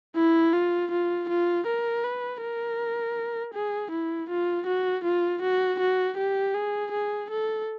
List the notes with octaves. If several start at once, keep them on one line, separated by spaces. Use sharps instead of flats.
E4
F4
F4
F4
A#4
B4
A#4
G#4
E4
F4
F#4
F4
F#4
F#4
G4
G#4
G#4
A4